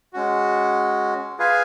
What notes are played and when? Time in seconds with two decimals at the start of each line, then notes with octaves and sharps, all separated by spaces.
0.13 G#3 C#4 F#4
1.39 F4 G#4 B4 F5 G#5